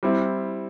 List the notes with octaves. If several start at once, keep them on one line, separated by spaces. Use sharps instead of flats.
G3 C4 E4